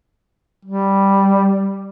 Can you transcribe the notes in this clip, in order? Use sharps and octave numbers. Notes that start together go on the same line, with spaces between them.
G3